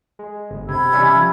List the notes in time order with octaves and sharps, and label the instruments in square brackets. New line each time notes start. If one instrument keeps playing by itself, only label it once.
[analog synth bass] G#3
G1
[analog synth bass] C3 [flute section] B5 E6 G#6
[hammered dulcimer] E3 G3 C#4
[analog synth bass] F3